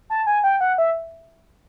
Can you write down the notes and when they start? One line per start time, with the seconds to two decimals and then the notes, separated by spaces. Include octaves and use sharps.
0.10 A5
0.27 G#5
0.44 G5
0.61 F#5
0.78 E5